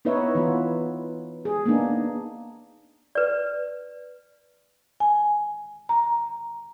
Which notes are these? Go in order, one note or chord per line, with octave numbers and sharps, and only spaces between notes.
B3 D#4 E4 B4 C#5 E5
E3 B3 F4
G#4
A#3 B3 D4 D#4
B4 D5
G#5
A#5